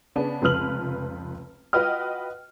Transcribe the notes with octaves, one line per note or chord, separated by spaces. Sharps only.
C#3 B3 C#4 D4
F1 C#2 F3 B4 F6 F#7
F4 F#4 B4 D#5 G5 F6